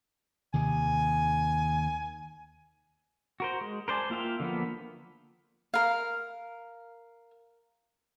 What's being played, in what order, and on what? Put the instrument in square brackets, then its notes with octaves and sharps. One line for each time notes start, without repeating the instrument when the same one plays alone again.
[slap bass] D#2 C3 D#3 [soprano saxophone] G#5
[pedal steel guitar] F#4 A#4 C5
G#3
A#4 C5 D5 G#5 A5
A#3 F4 E5 F5 G5
D3 F3 A#3 B3
[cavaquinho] A#4 F5